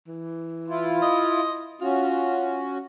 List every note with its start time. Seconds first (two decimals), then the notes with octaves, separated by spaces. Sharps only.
0.07 E3
0.68 E4 F4
1.02 D#5
1.81 C#4 F4 F#4